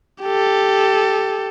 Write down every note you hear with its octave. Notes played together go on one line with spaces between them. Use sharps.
G4 A4